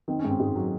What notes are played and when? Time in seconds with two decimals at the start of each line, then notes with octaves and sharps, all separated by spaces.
0.08 D#3 C4
0.19 C#4
0.25 G#2
0.30 C4
0.40 G#2 G#3
0.56 F#3